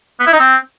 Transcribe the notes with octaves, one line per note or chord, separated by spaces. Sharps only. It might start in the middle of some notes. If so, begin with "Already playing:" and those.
B3
E4
D#4
C4